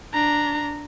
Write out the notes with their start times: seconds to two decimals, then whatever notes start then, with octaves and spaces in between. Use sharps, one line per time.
0.13 D4 A#5